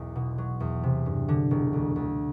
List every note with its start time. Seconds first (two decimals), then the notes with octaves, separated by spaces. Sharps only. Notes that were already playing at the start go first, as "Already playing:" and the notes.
Already playing: E1 B1 E2
0.16 B2
0.38 F#3
0.60 E2
0.83 C3
1.06 G2
1.28 D3
1.51 E1
1.73 D2
1.96 D2